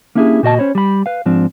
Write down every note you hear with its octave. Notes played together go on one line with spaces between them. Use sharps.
A#3 C#4 D4 E4 G4 G#4
A#2 F#4 D#5 A5
C#4 C5 C#5 B5
G3 B5
B4 F5
G#2 F3 C4 D4